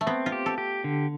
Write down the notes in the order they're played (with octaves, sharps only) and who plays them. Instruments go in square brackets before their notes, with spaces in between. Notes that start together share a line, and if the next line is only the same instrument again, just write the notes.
[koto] A3
[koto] B3 [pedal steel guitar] C4
[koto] F4
[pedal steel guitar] G4
[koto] A4
[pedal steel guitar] G4
D3